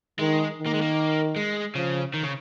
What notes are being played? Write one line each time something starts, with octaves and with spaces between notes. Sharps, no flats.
D#3 G#3
D#3
A#3
G#3
A#3
G#3
C#3 F3
D#3
C#3